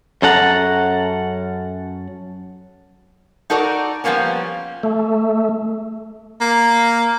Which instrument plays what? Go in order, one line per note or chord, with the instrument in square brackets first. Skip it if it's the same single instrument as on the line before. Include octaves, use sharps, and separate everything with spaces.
[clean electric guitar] F#2 C#4 A4 F#5 A#5
[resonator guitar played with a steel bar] D#4 F#4 A4 A#4 D5
F3 G3 A#3 B3 C#4
[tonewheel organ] A3
[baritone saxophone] A#3